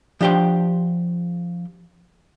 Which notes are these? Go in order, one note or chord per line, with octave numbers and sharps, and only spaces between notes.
F3 D4 G4 C5 G5